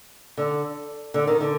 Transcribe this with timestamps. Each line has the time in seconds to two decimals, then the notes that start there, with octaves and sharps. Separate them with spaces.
0.37 D3
1.14 D3
1.27 D#3
1.40 D3